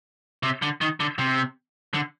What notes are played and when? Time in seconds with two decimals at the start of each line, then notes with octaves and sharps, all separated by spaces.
0.43 C3
0.62 D3
0.81 D#3
1.00 D3
1.19 C3
1.94 D3